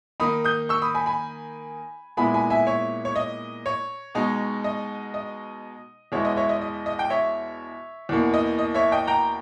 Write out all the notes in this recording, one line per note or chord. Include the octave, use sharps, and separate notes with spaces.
D#3 A#3 D#4 B5 D#6
D#6 G6
C#6 E6
B5 D#6
G#5 B5
G#5 B5
A#2 G#3 B3 E4 G#5 B5
G#5 B5
E5 G#5
C#5 E5
C#5
D#5
C#5
B2 G#3 D#4
D#5
D#5
E2 B2 G#3 B3 E4 C#5
D#5
C#5 E5
D#5
D#5
D#5
G5
C#5 E5
E2 B2 A#3
D#5
D#5
C#5 E5
D#5 G5
G5 A#5